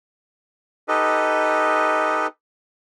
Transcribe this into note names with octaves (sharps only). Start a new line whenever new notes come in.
D#4 G4 A4 B4 D#5